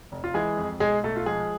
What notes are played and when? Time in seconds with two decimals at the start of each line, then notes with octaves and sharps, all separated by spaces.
0.12 F1
0.24 F4
0.34 E3 G#3 G#4
0.57 F2
0.80 B1 G#3 G#4
1.03 B1 A3 A4
1.16 F4
1.26 F3 G#3 G#4